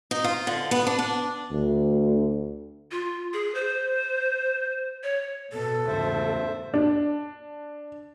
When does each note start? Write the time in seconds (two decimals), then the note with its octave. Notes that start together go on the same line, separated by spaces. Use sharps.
0.11 D#4
0.24 F4
0.47 D3
0.71 B3
0.87 D4
0.99 D4
1.51 D2
2.91 F4
3.33 G#4
3.55 C5
5.03 C#5
5.53 B2 A4
5.88 E2 G#2 C#3 C5 E5
6.74 D4